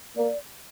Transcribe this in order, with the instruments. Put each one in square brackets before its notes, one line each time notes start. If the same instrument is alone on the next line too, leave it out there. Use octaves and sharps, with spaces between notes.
[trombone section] A#3 [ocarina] D5